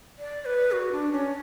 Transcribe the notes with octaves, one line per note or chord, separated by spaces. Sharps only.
D5
B4
F#4
D4
C#4